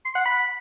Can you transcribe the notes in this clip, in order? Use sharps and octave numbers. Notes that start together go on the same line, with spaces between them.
C6
F#5
B5